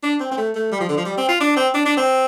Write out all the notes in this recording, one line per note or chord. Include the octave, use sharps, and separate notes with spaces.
D4
C4
C4
A3
A3
G3
F3
D3
F3
G3
C4
F4
D4
C4
D4
D4
C4